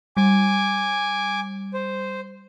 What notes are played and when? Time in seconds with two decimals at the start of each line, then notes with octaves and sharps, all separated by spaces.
0.17 G3 G#5 D6
1.74 C5